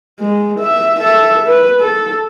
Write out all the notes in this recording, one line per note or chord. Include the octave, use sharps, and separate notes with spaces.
G#3
E5
A4 E5
B4
A4